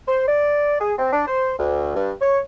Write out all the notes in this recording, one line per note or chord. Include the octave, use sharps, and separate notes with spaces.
C5
D5
G#4
C4
D4
C5
D2
G2
C#5